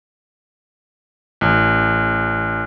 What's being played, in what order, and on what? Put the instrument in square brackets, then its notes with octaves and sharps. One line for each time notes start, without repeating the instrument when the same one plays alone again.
[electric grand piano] A1